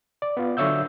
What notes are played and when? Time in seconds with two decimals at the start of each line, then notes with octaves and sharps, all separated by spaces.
0.22 D5
0.37 B3 F4
0.57 D3 F#3 C#5 E5 E6 G6